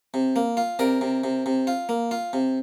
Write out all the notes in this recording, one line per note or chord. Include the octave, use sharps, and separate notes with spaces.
C3
A#3
F4
C3 A#4 D5
C3
C3
C3
F4
A#3
F4
C3